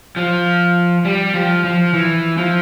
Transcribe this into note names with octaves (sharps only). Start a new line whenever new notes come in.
F3
G3
F3
F3
E3
F3